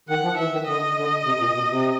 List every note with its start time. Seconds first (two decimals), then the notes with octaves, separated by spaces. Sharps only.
0.09 D#3 F#5
0.23 F3
0.38 E3 E5
0.53 D#3
0.67 D3 D#5
0.96 D3
1.25 C3
1.40 A#2
1.54 B2
1.69 C3